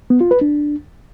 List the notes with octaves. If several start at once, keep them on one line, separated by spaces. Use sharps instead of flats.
B3
F4
B4
D4